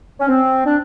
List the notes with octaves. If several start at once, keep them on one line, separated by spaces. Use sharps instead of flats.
C#4
C4
D4